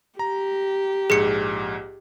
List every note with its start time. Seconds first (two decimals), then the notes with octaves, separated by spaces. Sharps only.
0.19 G4 A#5
1.10 A#1 G#2 G#4 C#7